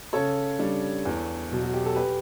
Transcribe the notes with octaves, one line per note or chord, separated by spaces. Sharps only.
C#3 A4 C#5
G3 D4
E2
B2 F#3
F#4
G4
A4
G4 B4